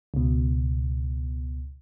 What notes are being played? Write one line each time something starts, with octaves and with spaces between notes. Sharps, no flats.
C#2 B2